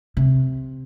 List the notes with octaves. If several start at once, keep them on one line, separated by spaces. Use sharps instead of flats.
C3